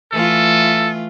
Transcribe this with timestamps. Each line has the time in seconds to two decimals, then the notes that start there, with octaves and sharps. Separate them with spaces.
0.12 E3 A3 F4 A4